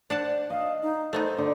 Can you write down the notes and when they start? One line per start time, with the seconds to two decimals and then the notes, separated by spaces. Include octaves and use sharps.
0.10 D4 C5 F#5 A5
0.50 D#5 F5
0.82 D#4
1.13 A3 B3 D#4 C5
1.38 D3